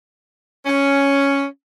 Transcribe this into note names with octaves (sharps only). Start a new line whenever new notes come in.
C#4